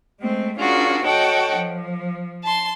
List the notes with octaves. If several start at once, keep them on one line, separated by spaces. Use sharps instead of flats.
G#3 A3 C4
C#4 D4 F4 F#4 G#4 A#4
F#4 A4 C#5 D#5 F#5 G5
F3
A5 C6